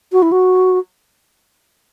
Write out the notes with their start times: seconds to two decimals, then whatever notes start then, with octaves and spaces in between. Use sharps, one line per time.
0.12 F#4
0.22 E4
0.32 F#4